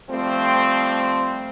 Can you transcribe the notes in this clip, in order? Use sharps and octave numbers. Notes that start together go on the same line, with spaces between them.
F3 G3 A3 C4